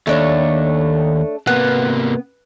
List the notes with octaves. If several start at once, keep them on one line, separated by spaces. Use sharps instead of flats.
D#2 A3 D4 C#5
C3 A#3 B3